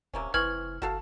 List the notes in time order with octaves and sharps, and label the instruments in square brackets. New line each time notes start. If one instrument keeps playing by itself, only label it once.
[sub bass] D#1 [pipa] C3 A#3 C#4
[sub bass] F1 [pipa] E3 C4 C#6 [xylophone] F6 G#6 F#7
[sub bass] F#1 [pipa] F#4 A4 F5